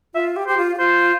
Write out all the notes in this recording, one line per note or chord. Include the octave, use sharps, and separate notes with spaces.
F4 E5
G4
G4 C5
F4
G4
F4 C5